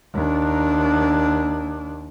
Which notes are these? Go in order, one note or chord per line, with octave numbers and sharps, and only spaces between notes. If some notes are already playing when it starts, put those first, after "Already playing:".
D#2 D4